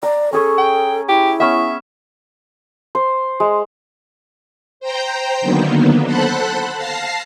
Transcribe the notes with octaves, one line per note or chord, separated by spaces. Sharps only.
D5 A#5
C#4 G#4 A4 C#5
G5
E4 G4
B3 C#4 E5 C#6
C5
G#3
C5 G5 A#5 G6
D3 D#3 F#3 A#3 B3
A4 C5 F#5 A5 B5 F#6
F5 A5 A#6 C7